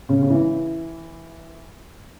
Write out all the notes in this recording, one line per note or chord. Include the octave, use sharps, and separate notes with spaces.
C#3
C#3
E3